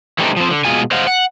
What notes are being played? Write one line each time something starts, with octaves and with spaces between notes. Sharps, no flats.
E3 G3 A3 C4 D4 D#4
F3 C4
D3
B2 G#3 F4 G#5
C5 D#5 F5 F#5
F#5